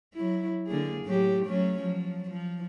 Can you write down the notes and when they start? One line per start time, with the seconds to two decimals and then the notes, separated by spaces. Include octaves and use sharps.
0.14 F#3 E4
0.67 D3 A#3 G#4
1.05 A2 F#3 G4
1.46 F#3 A3 C#4
1.80 F3 F#3
2.30 F3